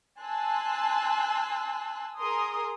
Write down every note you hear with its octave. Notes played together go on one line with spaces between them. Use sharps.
G#5 A5 C6 E6 F#6
G#4 A#4 A#5 C6 D#6